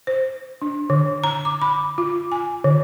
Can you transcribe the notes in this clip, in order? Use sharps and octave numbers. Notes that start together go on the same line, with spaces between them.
C5
D4
D3
A#5
D6
B5
F4
G#5
D3